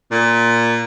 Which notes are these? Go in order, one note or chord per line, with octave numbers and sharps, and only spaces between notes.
A#2